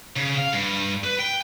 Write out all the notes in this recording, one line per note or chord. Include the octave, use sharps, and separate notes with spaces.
C#3
F5
G2
B4
G5